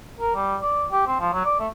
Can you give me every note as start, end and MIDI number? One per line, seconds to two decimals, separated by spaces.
0.20 0.33 70
0.35 0.56 55
0.62 0.86 74
0.91 1.03 67
1.07 1.16 60
1.20 1.29 53
1.33 1.44 54
1.45 1.58 74
1.60 1.68 57